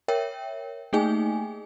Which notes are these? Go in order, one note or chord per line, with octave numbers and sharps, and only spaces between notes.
A#4 C#5 E5 G5
A3 A#3 D#4 G#4 G5 G#5